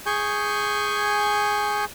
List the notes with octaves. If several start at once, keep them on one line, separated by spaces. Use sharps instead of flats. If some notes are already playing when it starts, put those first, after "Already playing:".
G#4 G#5 C#6 G6